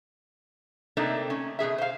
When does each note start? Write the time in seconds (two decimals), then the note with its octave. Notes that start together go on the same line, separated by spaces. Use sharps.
0.97 C3 A3 A#3 C4 D4 D#4
1.30 C#4
1.59 B2 F3 G#4 E5
1.78 C5 F5